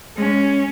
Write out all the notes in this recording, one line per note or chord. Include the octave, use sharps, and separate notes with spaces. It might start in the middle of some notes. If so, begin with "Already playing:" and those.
G#3 C#4